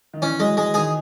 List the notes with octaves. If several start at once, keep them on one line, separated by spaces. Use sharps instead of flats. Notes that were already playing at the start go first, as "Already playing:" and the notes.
D#3
E3 C#4
F#3 G#3
G#3
D#3 G#4